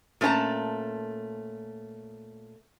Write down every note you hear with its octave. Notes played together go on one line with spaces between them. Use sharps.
A#2 A3 C#4 A#4 A5 A#5